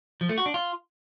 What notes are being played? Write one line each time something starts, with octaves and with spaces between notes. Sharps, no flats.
F3
A3
F#4
D4
F4